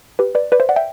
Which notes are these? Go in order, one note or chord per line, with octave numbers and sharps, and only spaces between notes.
G4 B4
B4 D5
B4 D5
C5 E5
D5 F#5
E5 G5